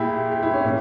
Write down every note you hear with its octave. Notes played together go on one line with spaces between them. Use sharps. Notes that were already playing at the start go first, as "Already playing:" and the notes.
Already playing: A#2 E4 G4 G#4
G4
E4
C#4
A#2